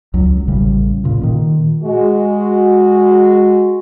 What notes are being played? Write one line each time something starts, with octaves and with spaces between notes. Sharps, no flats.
C#2 F#3
A1 C#3 G3
A#2 C#3
A#2 D#3
G#3 F#4